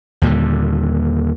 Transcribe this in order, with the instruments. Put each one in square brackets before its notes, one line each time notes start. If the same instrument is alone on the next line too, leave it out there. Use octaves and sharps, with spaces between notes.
[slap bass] D#2 A#2 D3 G3